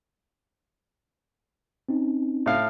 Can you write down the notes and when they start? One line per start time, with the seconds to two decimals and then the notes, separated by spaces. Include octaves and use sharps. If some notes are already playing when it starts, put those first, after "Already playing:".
1.89 C4 C#4 D#4
2.46 A2 F5